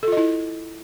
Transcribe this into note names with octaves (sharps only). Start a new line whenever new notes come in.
E4 F4 A4 D#5